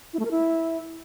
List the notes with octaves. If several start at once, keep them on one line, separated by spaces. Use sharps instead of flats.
E4
A3
A#4
E4